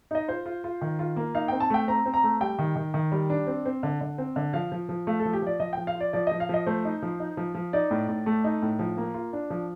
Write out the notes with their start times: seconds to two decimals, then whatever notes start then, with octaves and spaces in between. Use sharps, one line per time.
0.11 D#4 D#5
0.28 F4 C5
0.46 F4
0.64 F4
0.81 D#3
0.99 F4
1.16 A#3
1.35 D#4 F5
1.48 C4 G5
1.60 A5
1.70 A3 G5
1.88 C4 A#5
2.06 C4
2.14 A#5
2.23 A3
2.41 G3 G5
2.59 D#3
2.76 D#3
2.94 D#3
3.12 G3
3.30 D4
3.47 C4
3.66 C4
3.83 D3
4.01 D3
4.18 C4
4.36 D3
4.53 F3 F5
4.72 F3
4.89 F3
5.07 A3 F5
5.20 A4
5.25 F3
5.33 G4
5.42 F3 D5
5.60 F3 D#5
5.73 G5
5.77 F3
5.87 F5
5.95 F4
6.00 D5
6.13 F3 D5
6.27 D#5
6.31 F3
6.40 F5
6.49 F3 D#5
6.66 A3 C5
6.85 D#4
7.02 F3
7.20 D#4
7.37 F3
7.55 F3
7.73 D#4 D5
7.91 A2
8.08 A2
8.26 A3
8.44 D#4
8.62 A2
8.79 F3
8.97 A#3
9.14 F4
9.33 D4
9.50 F3